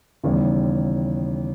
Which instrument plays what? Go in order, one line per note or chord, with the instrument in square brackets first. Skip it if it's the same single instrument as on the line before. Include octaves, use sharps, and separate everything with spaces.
[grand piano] D#2 C#3 E3 G3 B3